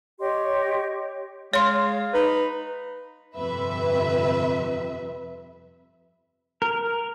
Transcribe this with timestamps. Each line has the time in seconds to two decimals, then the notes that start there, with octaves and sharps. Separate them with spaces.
0.20 G4 C#5 D#5 C6
1.54 G#3 C#5 F5 C6
2.14 D#4 B4
3.36 G1 F2 C3 B4 E5
6.62 A#4